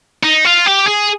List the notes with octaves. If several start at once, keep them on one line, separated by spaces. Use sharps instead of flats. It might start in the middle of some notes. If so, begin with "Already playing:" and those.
D#4
F4
G4
G#4